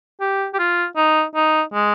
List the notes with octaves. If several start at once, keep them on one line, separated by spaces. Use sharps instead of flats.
G4
G4
F4
D#4
D#4
G#3